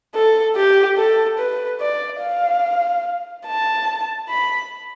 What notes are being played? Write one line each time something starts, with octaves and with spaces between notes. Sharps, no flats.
A4
G4
A4
B4
D5
F5
A5
B5